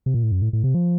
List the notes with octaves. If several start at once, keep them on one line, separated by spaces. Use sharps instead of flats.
C3
A#2
A2
F#2
A2
A2
C3
F3